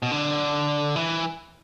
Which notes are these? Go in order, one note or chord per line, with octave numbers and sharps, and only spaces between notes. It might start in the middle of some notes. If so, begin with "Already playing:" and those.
B2
D3
E3